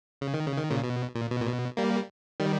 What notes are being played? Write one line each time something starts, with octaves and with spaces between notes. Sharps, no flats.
C#3
D#3
C#3
D#3
A#2 C#3
B2
A#2
B2
A#2
B2
G3 A#3
D#3 G3